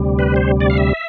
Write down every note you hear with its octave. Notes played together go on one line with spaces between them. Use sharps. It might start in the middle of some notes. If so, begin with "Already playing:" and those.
Already playing: D2 C3 G3
B4
C5
D5
F5
E5